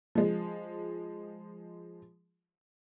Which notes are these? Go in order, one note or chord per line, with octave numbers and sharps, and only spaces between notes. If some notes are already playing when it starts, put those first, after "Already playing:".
F3 G#3